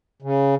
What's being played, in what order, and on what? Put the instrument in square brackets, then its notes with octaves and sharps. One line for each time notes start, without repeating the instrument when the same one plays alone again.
[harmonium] C#3